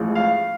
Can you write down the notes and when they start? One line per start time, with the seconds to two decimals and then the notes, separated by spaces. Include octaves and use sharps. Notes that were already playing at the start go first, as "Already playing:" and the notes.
Already playing: A1 A2 F3 G#3
0.15 F5